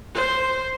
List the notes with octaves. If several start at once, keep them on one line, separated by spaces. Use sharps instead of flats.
C5